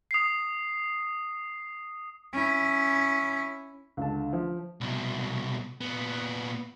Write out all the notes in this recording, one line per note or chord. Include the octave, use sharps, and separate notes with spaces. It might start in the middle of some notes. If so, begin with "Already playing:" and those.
D#6 C7
C#4 E4
C#2 D3 A5
F3
C2 B2
A#2 B3